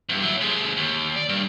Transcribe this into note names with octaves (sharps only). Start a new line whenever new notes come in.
E2 G2
F#3 E4
D#2 G#3
D#2
D5
G2